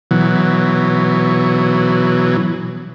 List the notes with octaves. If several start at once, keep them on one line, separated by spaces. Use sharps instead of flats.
B2 E3 F#3